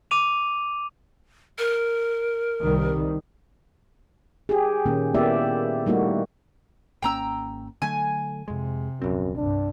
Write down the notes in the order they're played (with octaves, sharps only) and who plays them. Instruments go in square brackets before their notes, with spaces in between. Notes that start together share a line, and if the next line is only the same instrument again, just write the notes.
[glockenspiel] D6 D#7 F7
[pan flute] A#4
[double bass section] C2 D#3 G3
[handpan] G4 G#4
A#2 D#3 A#3 C#4
A#3 B3 E4 G4 D5 E5
G3 A3 A#3 D#4 E4 F#4
[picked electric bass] G#1 A#3 C#4 [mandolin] G5 A#5 E6
[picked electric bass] D3 F#3 A3 [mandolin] G#5
[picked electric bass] F2 G#3 [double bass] C3
[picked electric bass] D#1 A#1 C4 [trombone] F#2
[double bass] C2 G2 [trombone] D4